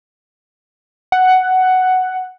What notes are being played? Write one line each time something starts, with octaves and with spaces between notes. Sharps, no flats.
F#5